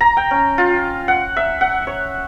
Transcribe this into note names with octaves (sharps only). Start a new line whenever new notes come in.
A#5
G5
C#4
F4
F#5
E5
F#5
C#5